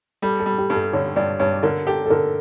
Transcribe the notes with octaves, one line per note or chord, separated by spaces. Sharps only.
G3 A4
A4
G3
G4
G2
A4
D3 C#5
G2 D5
G2 C#5
D3 A#4
G4 A4
A4
D3 A#4